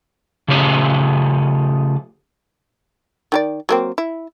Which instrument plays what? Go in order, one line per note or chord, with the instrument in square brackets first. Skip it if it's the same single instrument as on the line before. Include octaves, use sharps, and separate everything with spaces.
[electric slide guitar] C#3 F3 A3 C#4 G4 G#4
[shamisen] D#3 G4 D5
F#3 A#3 C4
E4